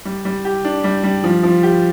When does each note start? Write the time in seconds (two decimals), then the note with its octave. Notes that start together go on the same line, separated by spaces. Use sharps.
0.05 G3
0.25 G3
0.45 G4
0.65 D4
0.84 G3
1.04 G3
1.24 F3
1.43 F3
1.63 G4